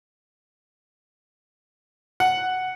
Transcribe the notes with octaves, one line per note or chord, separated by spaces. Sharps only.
F#5